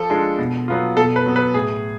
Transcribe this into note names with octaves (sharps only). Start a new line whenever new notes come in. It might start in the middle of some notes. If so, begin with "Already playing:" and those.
Already playing: F3 A4
G#3 D4 F4
B2
F#3 B3 F4
B2 A4
B4
F#3 B3
B4
A2 G#4